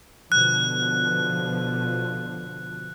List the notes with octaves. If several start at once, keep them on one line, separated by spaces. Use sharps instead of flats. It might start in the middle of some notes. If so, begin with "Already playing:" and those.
B2 D3 F3 F#6